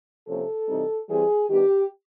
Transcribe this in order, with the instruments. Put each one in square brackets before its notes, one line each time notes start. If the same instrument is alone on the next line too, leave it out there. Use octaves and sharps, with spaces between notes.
[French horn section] C3 F3 A#3 C#4 A4
C3 E3 G3 C4 D#4
E3 G3 C4 G#4
D#3 G3 B3 D4 G4